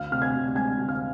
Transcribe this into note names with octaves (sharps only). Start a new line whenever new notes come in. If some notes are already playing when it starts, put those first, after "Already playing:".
Already playing: D2 F5 F6
C3 F6
G#5 G#6
D2
G#3 G#5 G#6
D2
F5 F6